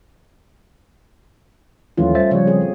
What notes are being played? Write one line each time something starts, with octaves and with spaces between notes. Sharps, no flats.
D#2 E3 F#3 A3 C#4 F4
G3 C5 E5 A6
C#3 F3 G3 C#5
C4 G#4